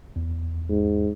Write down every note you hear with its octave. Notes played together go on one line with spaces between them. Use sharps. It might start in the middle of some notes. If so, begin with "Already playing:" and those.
E2
G#2